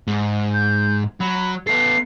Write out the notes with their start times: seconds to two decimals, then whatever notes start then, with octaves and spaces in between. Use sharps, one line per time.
0.07 G#2
0.54 G6
1.20 F#3 B5
1.67 B3 A4 C7